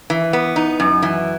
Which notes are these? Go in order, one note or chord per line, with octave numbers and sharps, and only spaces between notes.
E3
B3
D#4
F#2
E3